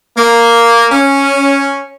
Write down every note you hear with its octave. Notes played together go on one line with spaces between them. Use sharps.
A#3
C#4